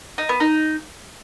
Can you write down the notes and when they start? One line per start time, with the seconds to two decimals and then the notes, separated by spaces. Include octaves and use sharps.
0.18 D#4
0.29 B3
0.40 D#4